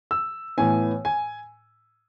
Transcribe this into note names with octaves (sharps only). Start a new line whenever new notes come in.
E6
A2 E3 B3 G#5
G#5